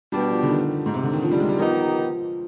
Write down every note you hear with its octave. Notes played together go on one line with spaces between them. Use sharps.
B2 G3 B3 D4 G4
F3
D3
D#3
G#2
C3
D3
D#3
F3
G3
G#3
G3
D#3 F3 B3 D#4 G4